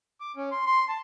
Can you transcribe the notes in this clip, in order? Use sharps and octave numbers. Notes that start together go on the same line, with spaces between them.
D6
C#4
C6
C6
A5